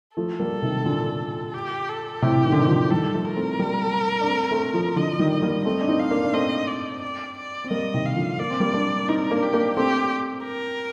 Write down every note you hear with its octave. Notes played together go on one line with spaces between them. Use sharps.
F3 A3 A4
G3 A#3
C3 D#3
A#2 D3
G4
A4
A2 C3 G4
D#3
D3
C3 D#3
D3 F3
D#3 G3 A4
F3 A3
A#4
A3 C4
G3 A#3
D4
A3 C4
A3 C4
F3 A3
D3 F3 D#5
D#3 G3
D#5
G3 A#3
A3 C4 D#5
D4
C4 D#4
F5
A#3 D4
D4
A3 C4 D#5
D5
D5
D5
C4
G3 A#3 D#5
C3 D#3
F5
D3 F3
A#3 D5
C4
G3 A#3
A#3 D4
C4 D#4 A#4
A#3 D4
G4
A#3 D4
A3 C4 G4
A#4